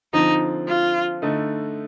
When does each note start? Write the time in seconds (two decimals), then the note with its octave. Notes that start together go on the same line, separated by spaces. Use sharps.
0.13 D3 F3 C4 D#4
0.68 F4
1.22 D3 A3 D#4